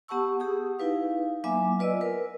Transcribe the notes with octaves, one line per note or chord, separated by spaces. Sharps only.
B3 G4 F#5 A5 C#6 E6
G4 G#4 D#6
D#4 E4 B4 F5
F#3 A#3 B3 E5 G#5 D6
F4 B4 D5 D#5 E6
A#4 B4